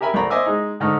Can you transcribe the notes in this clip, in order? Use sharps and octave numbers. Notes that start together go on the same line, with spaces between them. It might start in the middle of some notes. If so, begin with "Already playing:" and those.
G4 A#4 E5 G#5 B5
C2 A3 A#4 D5 A#5 B5
C5 D#5 E5 G#5 D6 E6
G#3 D#4
G#2 D3 A3 D#4 F6